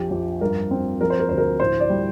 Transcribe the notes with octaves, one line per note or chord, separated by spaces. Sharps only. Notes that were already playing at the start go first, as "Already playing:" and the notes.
Already playing: A#1 F2 G4
F2
G2 A#4
C4
F3 A#4
C5
A#4
D2 C5
A#4
A2 C5
D5
G3